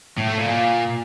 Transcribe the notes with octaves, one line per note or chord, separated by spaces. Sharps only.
A2
A3
A#2
A#2